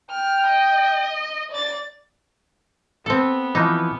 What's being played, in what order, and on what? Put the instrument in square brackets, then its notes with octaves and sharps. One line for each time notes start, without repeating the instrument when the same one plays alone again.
[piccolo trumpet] G5 [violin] F6
[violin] D#5
D5 A6
[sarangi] B3 [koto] C4 A4
[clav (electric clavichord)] E3 F3 [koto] D#4